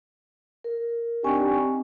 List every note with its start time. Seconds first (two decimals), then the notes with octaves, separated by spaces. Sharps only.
0.64 A#4
1.24 C4 D4 D#4 G4 G#5 C#6